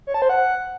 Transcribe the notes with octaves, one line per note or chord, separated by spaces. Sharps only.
C#5
A5
C5
F#5